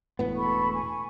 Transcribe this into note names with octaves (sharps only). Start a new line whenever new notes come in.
E1 A2 B3
A4 B5 C#6
G#5 C#6